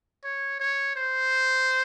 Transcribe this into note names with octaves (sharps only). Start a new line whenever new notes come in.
C#5
C#5
C5